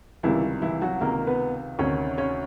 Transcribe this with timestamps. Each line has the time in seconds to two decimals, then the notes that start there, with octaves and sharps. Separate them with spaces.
0.23 C#2 C3 D#3 E3 G3 E4
0.62 E3 E4
0.82 F#3 F#4
1.01 C#2 C3 D#3 A#3 A#4
1.27 B3 B4
1.79 D2 C3 D#3 C#4 C#5
2.18 C#4 C#5